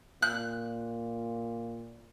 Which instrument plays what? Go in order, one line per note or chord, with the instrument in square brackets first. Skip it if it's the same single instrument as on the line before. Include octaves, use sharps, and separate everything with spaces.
[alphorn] A#2 [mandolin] F#6